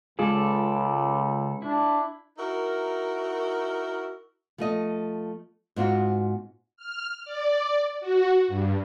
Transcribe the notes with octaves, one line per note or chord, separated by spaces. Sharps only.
C#2 C#3 G#3 F4 G#4 A4 D5
D4 E4
D#4 E4 F#4 A#4
F3 A3 D#5
G#2 C4 F4 F#4
F6
D5
F#4
G2